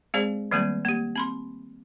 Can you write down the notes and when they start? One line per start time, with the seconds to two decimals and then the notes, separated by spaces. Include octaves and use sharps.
0.14 G#3 C4 G#4 C5 D5
0.51 D#3 F#3 G3 A3 A#3 C4
0.85 A#3 G4
1.15 C4 B5 C6